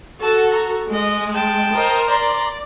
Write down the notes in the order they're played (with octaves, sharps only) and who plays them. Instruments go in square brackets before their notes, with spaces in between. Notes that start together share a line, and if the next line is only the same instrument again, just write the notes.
[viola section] F#4 A4 [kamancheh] A5
[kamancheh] A#5
[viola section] G#3 [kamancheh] D#5
[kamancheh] G5 A5
[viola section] A#4 C5 D#5
[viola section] D5 [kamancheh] A#5 C6